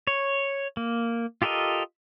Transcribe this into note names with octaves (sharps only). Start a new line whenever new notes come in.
C#5
A#3
F4 G4 A4 A#4 D#5